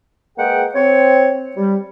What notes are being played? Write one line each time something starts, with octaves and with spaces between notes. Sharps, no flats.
G#3 A#3 G#4 B4 F#5 G5
C4 C#5
G3